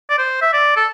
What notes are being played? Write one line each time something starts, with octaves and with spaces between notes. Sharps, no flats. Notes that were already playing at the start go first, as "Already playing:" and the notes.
D5
C5
E5
D5
A4